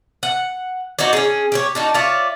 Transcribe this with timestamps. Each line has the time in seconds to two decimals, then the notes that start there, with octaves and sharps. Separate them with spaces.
0.23 F#5
0.99 D#4 F#4 C#5 D5
1.13 C#4 G#4
1.52 G4 C5 C#5
1.75 D4 D#4 F#4
1.94 F4 C#5 D5 E5